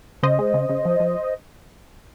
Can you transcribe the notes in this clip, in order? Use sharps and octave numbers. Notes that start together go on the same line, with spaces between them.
C#3 C5 D#5
G#3
C#3
C#3
F3
F3